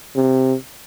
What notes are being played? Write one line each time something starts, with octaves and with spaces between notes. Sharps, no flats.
C3